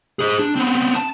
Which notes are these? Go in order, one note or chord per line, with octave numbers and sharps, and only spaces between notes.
G#4 C5
D4
B3 C4
A5